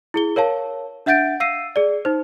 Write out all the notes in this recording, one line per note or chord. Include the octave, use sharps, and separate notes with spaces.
E4 G#4 G7
A#4 C#5 F5 A5
D4 E5 F#5 G6 A6 D7
F5 E6 C7 D#7
G#4 D5
D#4 C5